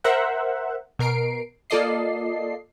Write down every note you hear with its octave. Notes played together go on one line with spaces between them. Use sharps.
A#4 C5 E5 F#5
B2 A#4 C7 D7
A#3 F4 A4 D5 D#5 C7